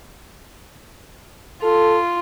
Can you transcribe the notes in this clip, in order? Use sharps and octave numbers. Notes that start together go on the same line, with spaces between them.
F4 A4